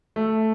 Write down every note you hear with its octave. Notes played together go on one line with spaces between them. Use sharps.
A3